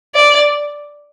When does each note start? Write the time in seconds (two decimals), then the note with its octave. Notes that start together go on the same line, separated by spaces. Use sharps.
0.15 D5